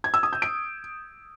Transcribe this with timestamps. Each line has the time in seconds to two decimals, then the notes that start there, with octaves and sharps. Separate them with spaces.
0.04 G#6
0.14 E6
0.23 D#6
0.33 G6
0.42 D7